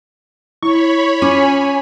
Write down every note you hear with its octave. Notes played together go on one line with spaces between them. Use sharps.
E4 C#5 B5 C#6
C#4 F4 G#5 C#6 D6